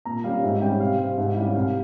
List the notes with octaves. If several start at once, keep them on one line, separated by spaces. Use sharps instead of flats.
A#2 A#5
G3 C#4 F5
G#2 E5
G3 C#4 G5
C3 F5
G3 C4 F5
G#2 E5
G3 C#4 E4 F5
C2 F5